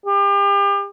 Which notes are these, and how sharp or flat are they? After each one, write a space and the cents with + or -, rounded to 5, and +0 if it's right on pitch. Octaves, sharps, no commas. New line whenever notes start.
G4 +35